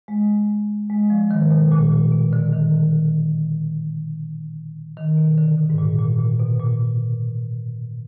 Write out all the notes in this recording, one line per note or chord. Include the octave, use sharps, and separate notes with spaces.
G#3
G#3
F3
D#3
B2
A#2
A#2
B2
D3
D#3
D#3
B2
D3
B2
G#2
A#2
A#2
A#2
B2
A#2